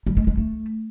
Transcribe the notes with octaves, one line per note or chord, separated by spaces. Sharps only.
G3
G#3
G#3
A3